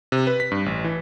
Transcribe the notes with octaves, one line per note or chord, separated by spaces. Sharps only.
C3
B4
B6
G2
A1
E3